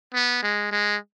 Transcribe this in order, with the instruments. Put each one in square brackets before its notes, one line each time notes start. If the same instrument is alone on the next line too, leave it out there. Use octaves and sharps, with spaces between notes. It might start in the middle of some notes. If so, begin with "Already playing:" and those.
[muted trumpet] B3
G#3
G#3